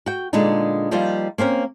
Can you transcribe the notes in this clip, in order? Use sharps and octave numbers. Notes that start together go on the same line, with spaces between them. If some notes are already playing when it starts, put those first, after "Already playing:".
F#4 G5
A#2 D3 G#3 B3 D4 D#4
F3 G3 A#3 D#4 F4
A#3 C4 C#4 A#4